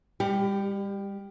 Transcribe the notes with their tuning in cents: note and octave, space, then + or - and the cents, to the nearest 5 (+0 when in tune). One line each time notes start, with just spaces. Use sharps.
G3 +35 G4 +0